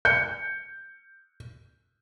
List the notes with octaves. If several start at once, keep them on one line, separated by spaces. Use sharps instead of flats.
G6 C#7